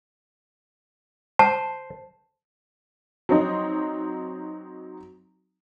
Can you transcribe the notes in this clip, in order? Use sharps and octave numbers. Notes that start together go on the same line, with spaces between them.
C5 A5
F#3 C4 D#4